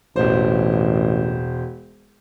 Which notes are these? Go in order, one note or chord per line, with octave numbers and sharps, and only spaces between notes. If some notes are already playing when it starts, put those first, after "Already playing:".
E1 A1 C5